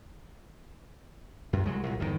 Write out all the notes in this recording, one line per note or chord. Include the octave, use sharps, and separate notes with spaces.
F#2
C2 F#3 G#3
C2 A#2
G1 E2 B2 D#3